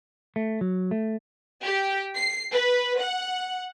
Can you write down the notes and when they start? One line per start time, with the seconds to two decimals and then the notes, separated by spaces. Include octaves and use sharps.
0.36 A3
0.61 F#3
0.91 A3
1.63 G4
2.15 C7
2.52 B4
2.99 F#5